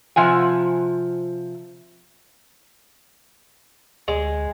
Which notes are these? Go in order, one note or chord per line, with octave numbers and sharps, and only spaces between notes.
C3 F3 F#5 G#5
D2 G#3